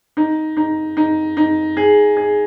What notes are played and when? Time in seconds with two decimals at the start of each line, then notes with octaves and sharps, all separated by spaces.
0.17 D#4
0.57 D#4
0.97 D#4
1.37 D#4
1.77 G#4
2.17 G#4